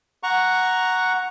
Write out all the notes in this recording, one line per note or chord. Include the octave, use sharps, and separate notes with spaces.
F#5 A#5 C#6